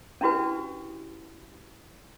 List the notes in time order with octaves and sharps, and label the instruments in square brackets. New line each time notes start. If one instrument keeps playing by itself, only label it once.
[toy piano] C#4 D4 E4 F#4 G4 B4